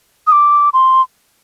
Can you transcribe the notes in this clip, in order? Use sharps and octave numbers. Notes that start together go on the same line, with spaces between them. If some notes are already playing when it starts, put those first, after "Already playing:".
D#6
D6
C6